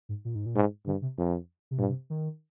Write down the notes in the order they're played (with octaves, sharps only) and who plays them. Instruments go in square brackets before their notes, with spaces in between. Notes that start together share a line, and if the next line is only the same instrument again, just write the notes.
[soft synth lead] G#2
A#2
G#2
A#2
[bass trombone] G#2
[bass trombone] G2 [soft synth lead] D3
[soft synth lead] C3
[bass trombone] F2
[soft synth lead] C3
[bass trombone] G2 [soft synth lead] A#2
[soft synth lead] C3
D#3